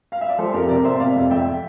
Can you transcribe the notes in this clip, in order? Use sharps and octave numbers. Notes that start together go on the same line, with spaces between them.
F5
E5
D5
F3 A4 C5
F2 G4 A#4
C3 A#4 D5
C3 C5 E5
C3 D5 F5
F2
F2 E5 G5